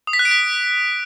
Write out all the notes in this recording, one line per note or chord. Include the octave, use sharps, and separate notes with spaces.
D#6
B6
F#6
D7
B6